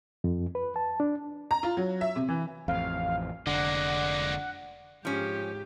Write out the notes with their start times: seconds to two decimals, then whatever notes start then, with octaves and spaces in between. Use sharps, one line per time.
0.24 F2
0.55 B4
0.76 A5
1.00 D4
1.51 A#5
1.63 F4
1.77 F#3
2.01 E5
2.16 C3
2.29 E3
2.68 A1 F2 F5
3.47 F1 D3 G#3 A#3 D5 F#5
5.05 G#2 F3 C#4 G4